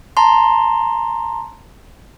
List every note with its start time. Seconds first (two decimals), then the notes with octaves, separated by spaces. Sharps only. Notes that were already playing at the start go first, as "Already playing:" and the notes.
0.17 A5 A#5 C6